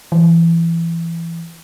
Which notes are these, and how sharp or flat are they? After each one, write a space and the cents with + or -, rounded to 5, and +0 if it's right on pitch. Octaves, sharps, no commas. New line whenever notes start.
E3 +20